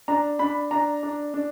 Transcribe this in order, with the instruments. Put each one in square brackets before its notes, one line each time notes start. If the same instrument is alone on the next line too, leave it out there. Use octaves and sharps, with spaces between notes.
[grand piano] D4 A#5
D4 B5
D4 A#5
D4
D4